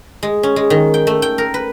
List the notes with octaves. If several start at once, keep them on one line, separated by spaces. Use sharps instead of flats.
G#3
C#4
G#3
D#3
G5
A3
G5
A#4
B4